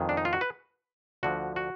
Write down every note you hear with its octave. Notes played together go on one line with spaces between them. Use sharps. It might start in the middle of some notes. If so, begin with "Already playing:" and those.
Already playing: F2 D#3 G#3
D4
D#4
F4
F#4
B4
D2 D3 F3 F#4
F#4